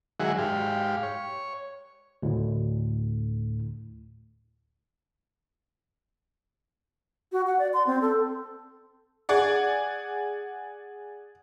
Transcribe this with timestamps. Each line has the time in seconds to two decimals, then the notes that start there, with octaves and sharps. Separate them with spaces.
0.20 D#3 F#3 G#3 G#4 E5 F#5
0.38 G#2 G4 F5
1.03 C#5
2.23 D2 A2
7.32 F#4
7.47 F#5
7.59 D5
7.73 C6
7.86 C4
8.02 A4
9.29 G#4 D5 F#5